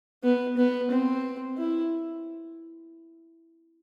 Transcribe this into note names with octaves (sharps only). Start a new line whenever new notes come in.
B3
B3
C4
E4